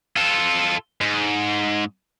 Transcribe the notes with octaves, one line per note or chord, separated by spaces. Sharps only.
F4 A4
G#2